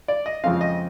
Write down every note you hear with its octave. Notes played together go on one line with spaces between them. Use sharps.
D5
D#5
F2 C#3 F3 G#3 C4 F5
D#5